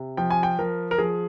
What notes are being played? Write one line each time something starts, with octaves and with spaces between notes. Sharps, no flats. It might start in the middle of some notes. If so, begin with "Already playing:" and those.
Already playing: C3
F3 G5
G#5
G5
F3 A#4
A#4
F3 G#4